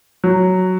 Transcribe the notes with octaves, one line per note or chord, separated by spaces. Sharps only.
F#3